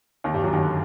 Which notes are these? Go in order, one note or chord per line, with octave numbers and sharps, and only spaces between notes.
D#2 D#3
G2 G3
F#2 F#3
D#2 D#3
D3